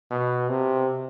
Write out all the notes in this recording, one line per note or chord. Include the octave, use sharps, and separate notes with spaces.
B2
C3